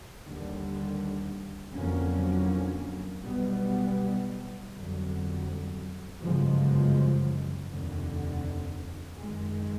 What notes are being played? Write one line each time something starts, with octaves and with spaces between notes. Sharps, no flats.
D#2 D3 G3
F2 D3 F#3 A#3 C#4
B1 B2 G3 B3
G1 F2 D3 F#3
G1 F#2 C#3 F3 G#3
F1 D#2 D3
F#2 D#3 G#3